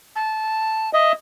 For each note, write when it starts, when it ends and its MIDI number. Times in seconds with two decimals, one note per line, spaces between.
0.16 0.92 81
0.93 1.12 75
0.93 1.13 76